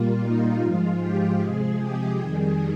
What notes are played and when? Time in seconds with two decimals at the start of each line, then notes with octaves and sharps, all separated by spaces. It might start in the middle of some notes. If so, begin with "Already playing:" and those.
Already playing: A#2 G3 A#3 F4
0.21 D#4
0.60 G#2 F3 G#3 F4
1.00 G4
1.40 C3 F3 G#3 G#4
1.79 G4
2.18 F2 D#3 G3 G#4